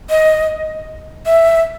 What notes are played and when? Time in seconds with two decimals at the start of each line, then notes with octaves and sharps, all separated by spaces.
0.10 D#5
1.26 E5